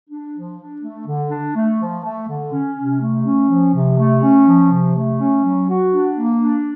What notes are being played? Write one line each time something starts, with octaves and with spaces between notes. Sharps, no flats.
D4
F3
D4
A3
D3
D4
A3
F3
A3
D3
C#4
C3
A3
C#4
F3
C3
A3
C#4
F3
C3
A3
C#4
F#3
F#4
D4
A#3
D4